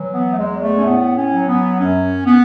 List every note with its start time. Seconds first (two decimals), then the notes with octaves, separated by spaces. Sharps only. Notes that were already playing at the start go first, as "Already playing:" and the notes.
Already playing: E3 F#3
0.13 B3
0.32 A3
0.36 E2 G#3
0.61 A3
0.77 C#4
0.84 A2 B3
1.16 C#4
1.31 F#3
1.47 B3
1.78 F#2 C#4
2.26 B3